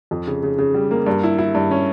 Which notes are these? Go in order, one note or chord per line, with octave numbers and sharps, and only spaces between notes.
F2
C#3
C#3
C#3
G3
A#3
G2
E4
E4
G2
C#4